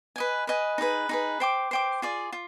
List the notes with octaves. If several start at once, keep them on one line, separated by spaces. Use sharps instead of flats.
B4 D#5 G#5
B4 D#5 G#5
D#4 G#4 B4
D#4 G#4 B4
C5 G5 D6
C5 G5 D6
F4 G#4 D5
F4